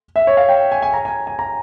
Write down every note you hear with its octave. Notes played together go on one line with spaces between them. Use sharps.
E5
C#5
F5
G5
G#5
G#5
A#5
G#5
G#5
A#5